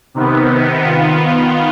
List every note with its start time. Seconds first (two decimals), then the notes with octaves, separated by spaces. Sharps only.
0.14 C3 D#3 B3
0.83 D#3 B3 F4